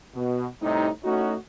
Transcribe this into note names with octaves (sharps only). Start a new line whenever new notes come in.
B2
A2 C3 G3 D#4
A3 C#4 D#4 E4 F#4